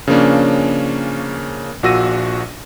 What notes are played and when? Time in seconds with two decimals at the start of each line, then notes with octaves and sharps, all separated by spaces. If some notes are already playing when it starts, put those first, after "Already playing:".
0.07 C#3 F3 A#3 C#4 D4
1.83 A#1 A#2 F#4 E6 A#6 D#7